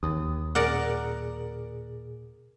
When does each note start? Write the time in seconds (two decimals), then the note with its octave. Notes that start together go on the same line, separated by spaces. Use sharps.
0.03 D#2 D#6
0.55 A#2 G#4 A#4 D5 F#5